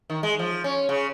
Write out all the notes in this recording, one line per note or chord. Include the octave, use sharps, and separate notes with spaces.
D#3
G#3
F3
C#4
C#3